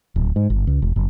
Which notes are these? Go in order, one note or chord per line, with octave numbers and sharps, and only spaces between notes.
D1
G#2
G1
C#2
E1
F#1